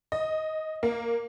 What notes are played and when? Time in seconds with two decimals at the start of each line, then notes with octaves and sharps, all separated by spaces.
0.12 D#5
0.83 A#3